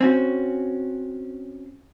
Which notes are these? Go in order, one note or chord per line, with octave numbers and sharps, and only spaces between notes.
C4 C#4 F#4